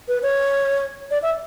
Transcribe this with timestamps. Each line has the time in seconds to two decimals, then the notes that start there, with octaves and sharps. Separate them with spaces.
0.08 B4
0.23 C#5
1.11 D5
1.22 E5